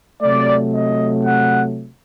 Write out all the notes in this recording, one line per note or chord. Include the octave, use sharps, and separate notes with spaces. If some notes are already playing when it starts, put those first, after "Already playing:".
C3 F#3 A3 D5
D#5
F#5